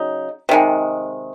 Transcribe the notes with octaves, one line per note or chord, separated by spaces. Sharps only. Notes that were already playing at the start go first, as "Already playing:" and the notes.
Already playing: C#3 F#3 D#4
C3 D#3 G#3